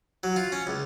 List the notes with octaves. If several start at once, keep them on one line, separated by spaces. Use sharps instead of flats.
F#3
F4
C#4
C#2